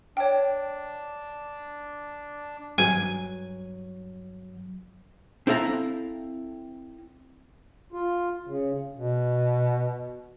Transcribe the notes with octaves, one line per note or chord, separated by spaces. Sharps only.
D4 C#5 G5
G2 F#3 G#5
C4 E4 A4 F5 A#5
F4
C#3
B2